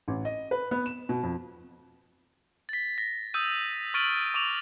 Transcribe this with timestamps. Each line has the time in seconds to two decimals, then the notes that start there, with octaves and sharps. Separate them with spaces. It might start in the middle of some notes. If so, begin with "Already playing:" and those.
0.08 A1
0.25 D#5
0.51 B4
0.71 B3
0.86 E7
1.09 B2
1.23 F2
2.69 A6 B6
2.98 A#6
3.34 D#6 E6 G6 D#7
3.94 C#6 F6 A6 D7 D#7 F#7
4.34 C#6 D6 F7